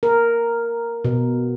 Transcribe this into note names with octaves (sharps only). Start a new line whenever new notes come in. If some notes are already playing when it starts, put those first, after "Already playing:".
A#4
B2